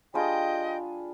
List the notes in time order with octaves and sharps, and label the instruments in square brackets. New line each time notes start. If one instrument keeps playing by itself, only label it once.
[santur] G3 D4 F4 G#4 [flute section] D#5 G5